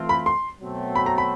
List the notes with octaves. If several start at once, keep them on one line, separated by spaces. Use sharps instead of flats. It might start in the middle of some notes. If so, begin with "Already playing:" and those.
Already playing: E3 A3 C4 F4
B5
C6
B2 F#3 A3 C4
B5
A#5
B5